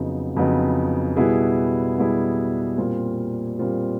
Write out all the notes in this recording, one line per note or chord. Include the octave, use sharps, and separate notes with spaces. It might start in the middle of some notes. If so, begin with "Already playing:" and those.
Already playing: F2 C#3 F#3 B3 D#4
F2 C#3 F#3 B3 D#4
B2 G3 B3 E4 G#4
B2 G3 B3 E4 G#4
A#2 G3 C4 F4
A#2 G3 C4 F4